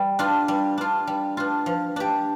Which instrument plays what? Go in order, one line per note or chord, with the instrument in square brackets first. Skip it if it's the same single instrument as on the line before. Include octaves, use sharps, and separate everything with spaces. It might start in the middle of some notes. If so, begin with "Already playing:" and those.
Already playing: [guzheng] G3
D4 F4
G3
D4 F4
G3
D4 F4
F3
D4 G4